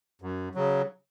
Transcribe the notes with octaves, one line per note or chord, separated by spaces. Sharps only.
F#2
C#3 F#3